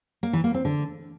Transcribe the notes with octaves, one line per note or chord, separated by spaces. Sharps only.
A#3
E3
A#3
C4
D3